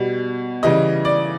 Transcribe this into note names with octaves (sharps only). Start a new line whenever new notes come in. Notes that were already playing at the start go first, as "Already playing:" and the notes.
Already playing: B2 G3
C#3 E3 G3 D#5
D5